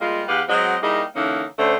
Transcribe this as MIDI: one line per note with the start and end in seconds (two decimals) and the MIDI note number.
0.01 0.24 55
0.01 0.24 56
0.01 0.24 58
0.01 0.24 65
0.28 0.43 40
0.28 0.43 67
0.28 0.43 71
0.28 0.43 77
0.28 0.43 78
0.49 0.77 54
0.49 0.77 56
0.49 0.77 60
0.49 0.77 66
0.49 0.77 75
0.83 1.03 55
0.83 1.03 58
0.83 1.03 63
0.83 1.03 64
0.83 1.03 68
1.16 1.44 50
1.16 1.44 52
1.16 1.44 58
1.16 1.44 61
1.16 1.44 63
1.59 1.77 38
1.59 1.77 50
1.59 1.77 57
1.59 1.77 61
1.59 1.77 72